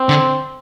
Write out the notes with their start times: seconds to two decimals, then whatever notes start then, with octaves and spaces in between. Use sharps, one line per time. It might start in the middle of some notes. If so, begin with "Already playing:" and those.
Already playing: C4
0.09 D3